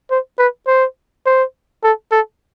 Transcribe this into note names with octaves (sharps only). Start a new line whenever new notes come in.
C5
B4
C5
C5
A4
A4